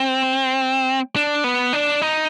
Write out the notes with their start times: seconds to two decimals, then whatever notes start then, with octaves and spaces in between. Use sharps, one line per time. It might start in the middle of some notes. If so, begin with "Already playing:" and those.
Already playing: C4
1.16 D4
1.44 B3
1.73 D4
2.02 D#4